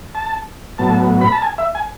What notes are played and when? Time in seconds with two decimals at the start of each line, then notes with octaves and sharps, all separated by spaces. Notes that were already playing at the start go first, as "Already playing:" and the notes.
0.15 A5
0.78 A2 F#3 B3 A5
1.21 B5
1.32 A5
1.42 G#5
1.58 E5
1.75 G#5